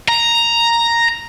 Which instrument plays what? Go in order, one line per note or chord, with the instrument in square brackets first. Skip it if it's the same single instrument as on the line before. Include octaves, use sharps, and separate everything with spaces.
[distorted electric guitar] A#5